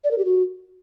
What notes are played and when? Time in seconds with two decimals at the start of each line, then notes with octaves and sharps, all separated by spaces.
0.04 D5
0.11 A#4
0.18 G4
0.25 F#4